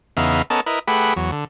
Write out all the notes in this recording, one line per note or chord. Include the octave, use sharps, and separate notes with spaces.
E2 C#3 B3 D#4 E5 F5
B3 C#4 A4 A#4 D#5 A5
E4 A#4 B4 D#5
A3 G4 G#4 B4 F#5 B5
E2 F#3
D3